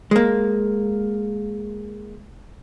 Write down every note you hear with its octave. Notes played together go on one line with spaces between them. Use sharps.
G#3 A#3